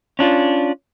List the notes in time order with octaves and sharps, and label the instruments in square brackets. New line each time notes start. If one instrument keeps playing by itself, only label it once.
[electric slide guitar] C#4 D4 F4